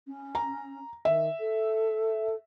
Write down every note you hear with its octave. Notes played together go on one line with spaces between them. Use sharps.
C#4
A#5
D#3 E5
A4